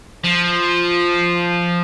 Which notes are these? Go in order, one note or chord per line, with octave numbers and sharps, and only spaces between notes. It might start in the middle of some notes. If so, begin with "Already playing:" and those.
F3